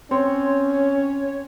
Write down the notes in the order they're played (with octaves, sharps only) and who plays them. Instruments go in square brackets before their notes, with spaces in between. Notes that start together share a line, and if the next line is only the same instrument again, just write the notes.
[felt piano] C4 [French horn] C#4 [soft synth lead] C#5